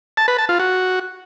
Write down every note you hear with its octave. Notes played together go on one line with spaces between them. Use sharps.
A5
B4
A5
F4
F#4